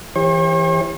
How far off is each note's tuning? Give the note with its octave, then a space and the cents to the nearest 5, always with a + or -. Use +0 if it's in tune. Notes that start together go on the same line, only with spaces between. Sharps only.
E3 +0 G4 +30 C#5 -45